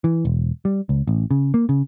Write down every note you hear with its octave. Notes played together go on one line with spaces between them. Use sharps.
E3
E1
G3
C#2
A1
C#3
A#3
C#3